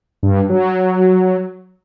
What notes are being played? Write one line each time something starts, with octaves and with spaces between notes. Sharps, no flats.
G2
F#3